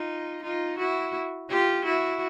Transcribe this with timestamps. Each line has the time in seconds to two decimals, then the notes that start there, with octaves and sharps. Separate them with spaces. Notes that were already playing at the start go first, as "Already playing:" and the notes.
Already playing: D#4 F4
0.43 D#4 F4
0.78 E4 F#4
1.49 F4 G4
1.85 E4 F#4